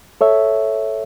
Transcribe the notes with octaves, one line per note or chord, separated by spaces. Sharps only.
A4 C#5 E5